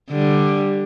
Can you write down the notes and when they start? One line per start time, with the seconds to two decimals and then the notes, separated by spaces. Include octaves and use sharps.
0.11 D3 G3